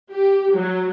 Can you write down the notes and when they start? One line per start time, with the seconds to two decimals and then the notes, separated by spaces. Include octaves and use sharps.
0.12 G4
0.53 F#3